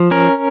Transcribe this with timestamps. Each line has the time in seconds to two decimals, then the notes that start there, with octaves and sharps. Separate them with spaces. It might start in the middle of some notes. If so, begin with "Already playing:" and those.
Already playing: F3
0.11 C#4 A#4